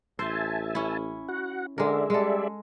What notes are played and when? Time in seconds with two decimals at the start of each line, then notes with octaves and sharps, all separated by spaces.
0.19 A1 C5 E5 G#5 A5
0.75 C#4 E4
1.29 F#4 F#5
1.78 D3 G#3 G#4 A#4 D5 E5
2.10 G3 G#3 A4